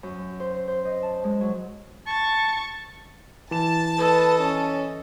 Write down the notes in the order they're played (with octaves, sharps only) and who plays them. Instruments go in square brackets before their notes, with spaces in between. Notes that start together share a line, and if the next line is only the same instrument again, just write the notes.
[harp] F#2
C5
C5
D#5
A5
G#3
F#3
[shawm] A5 [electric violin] C#6 A6
[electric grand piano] E3 E7 [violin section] A5
[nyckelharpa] A4 D#5 [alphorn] B4
[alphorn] C#4